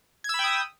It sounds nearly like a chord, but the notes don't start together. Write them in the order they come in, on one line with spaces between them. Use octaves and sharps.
G#6 E6 B5 G5 D#6